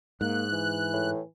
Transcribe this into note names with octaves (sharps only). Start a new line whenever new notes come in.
G#2 A#3 F#6
E3
A2